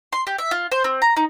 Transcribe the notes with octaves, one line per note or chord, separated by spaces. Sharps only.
C6
G4
E5
F4
C5
C4
A#5
D#4